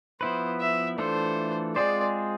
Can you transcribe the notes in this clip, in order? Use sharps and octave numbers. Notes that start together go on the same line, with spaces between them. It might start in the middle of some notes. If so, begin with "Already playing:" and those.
F3 B3 E4 B4 C5
E5
E3 A3 D4 F4 A4 C5
G#3 C4 F4 G#4 C5 D5